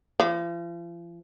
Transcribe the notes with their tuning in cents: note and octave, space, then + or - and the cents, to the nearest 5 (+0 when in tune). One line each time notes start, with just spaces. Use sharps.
F3 -40